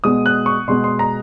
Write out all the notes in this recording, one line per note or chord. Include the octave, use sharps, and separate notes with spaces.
B2 G#3 B3 D#6
F#6
C#6
B2 G#3 B3 C6
C6
A#5